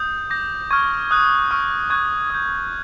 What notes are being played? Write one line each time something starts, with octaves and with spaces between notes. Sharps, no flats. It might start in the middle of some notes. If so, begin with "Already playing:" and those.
Already playing: D#6 G6
D6 G6 A#6
C#6 F6 G#6
D#6 F#6
C#6 F6
C#6 F#6 G#6
D#6 G6